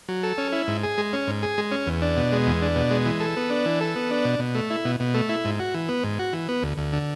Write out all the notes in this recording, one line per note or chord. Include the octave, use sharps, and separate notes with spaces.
F#3
A4
C#4
E4
G#2
G#4
G#3
C#4
G#2
G#4
G#3
C#4
E2
D4
B2
G#3
E2
D4
B2
G#3
E3
A4
B3
D4
E3
A4
B3
D4
B2
B2
A3
E4
B2
B2
A3
E4
G#2
F#4
E3
B3
G#2
F#4
E3
B3
D2
D2
D3